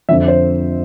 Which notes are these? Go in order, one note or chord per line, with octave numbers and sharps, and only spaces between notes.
F2 D3 F3 E5
C5